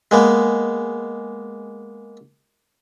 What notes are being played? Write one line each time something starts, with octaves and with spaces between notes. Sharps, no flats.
G#3 A#3 B3